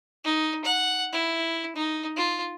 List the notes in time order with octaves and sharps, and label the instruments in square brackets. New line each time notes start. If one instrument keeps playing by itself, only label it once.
[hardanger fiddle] D#4
F#5
E4
D#4
F4